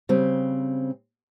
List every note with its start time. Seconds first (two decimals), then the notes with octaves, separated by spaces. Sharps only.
0.09 C#3 G3 C4